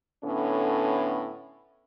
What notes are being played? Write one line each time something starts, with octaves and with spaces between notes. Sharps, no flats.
A2 D3 B3 C#4